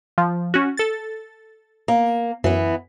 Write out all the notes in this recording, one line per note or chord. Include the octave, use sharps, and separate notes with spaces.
F3
C#4 F#4
A4 A6
A#3
F#2 E3 B3